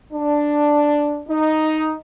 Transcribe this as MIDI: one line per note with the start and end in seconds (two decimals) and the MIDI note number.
0.12 1.21 62
1.27 1.94 63